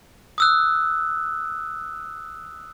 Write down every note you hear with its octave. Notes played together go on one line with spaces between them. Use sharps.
D#6 E6 F#6